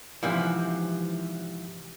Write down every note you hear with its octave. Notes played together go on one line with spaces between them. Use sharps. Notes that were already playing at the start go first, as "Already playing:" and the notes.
G#2 C3 E3 F3